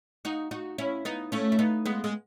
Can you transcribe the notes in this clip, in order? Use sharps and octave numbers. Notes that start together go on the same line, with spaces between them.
D#4 F#4
D#4 F#4
C#4 E4
B3 D#4
A3 C#4
E4
B3 D#4
G#3 B3
G#3